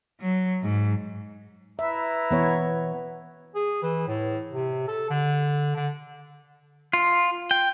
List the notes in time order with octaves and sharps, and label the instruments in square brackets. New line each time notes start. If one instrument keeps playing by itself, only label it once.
[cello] F#3
G#2
[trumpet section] E4 B4 A#5 [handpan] E5
[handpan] E3 B3 C#5
[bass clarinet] G#4
E3
A2
C3
A4
D3
D3
[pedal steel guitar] F4
G5